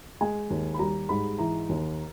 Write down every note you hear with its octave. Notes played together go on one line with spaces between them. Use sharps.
G#3 G#5
D#2
B5
G3 A#5
G#2 B5
E3 A#5
D#2